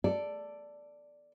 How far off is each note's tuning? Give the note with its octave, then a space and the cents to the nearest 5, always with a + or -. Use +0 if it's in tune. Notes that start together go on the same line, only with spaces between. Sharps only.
A4 +10 D5 +0